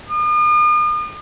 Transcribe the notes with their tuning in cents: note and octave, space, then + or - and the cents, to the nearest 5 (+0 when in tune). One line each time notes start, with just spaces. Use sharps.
D#6 -45